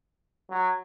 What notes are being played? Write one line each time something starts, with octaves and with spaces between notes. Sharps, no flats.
F#3